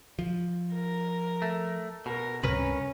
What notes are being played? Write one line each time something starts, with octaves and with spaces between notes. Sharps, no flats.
F3
A#4
A3
B2 A#4
C#2 G2 C3 C#4 A#4 B4 B5